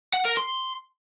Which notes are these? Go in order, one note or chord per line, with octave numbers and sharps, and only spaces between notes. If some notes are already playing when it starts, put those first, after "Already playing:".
F#5
A#4
C6